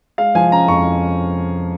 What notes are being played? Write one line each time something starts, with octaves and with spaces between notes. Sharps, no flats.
G#3 F5
F3 G#5
C#4 A#5
F2 C#6